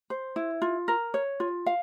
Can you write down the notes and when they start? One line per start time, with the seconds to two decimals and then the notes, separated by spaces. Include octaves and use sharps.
0.10 C5
0.36 E4
0.62 F4
0.88 A#4
1.14 C#5
1.40 F4
1.66 F5